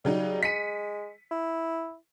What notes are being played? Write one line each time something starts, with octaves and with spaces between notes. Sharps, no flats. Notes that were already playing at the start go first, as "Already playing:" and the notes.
C#3 F#3 G3 D#4
G#3 B6 C#7 D#7
E4